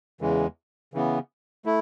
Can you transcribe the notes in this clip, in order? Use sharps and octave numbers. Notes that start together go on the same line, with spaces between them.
E2 C#3 E3 G#3
C#3 E3 B3
A3 E4